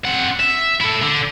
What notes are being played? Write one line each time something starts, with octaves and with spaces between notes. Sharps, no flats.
C4 F#5
E5
E4 A4
D3